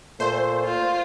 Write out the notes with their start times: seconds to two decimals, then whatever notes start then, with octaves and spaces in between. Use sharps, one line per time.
0.20 A#2 A3 C5
0.64 F4